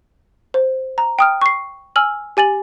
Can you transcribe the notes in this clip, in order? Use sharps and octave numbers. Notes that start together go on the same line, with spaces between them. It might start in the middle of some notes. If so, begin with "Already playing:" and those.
C5
A#5
G5 D#6 F6
C#6 C7
G#5 E6 F6 F#7
G4 G#5 A6 F#7